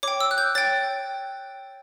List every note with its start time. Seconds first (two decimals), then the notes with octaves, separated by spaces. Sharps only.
0.03 C#5 G5 D6
0.20 E6
0.31 F#6
0.38 G6
0.55 C#5 G5 A6